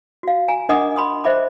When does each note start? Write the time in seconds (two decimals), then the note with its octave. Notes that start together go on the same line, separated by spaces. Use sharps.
0.23 F#4 F5
0.48 G#5 A#5
0.69 D4 A#4 D#5 F#5 D6 D#6
0.96 B5 C6 D#6
1.24 C5 D#5 E5 B5 D6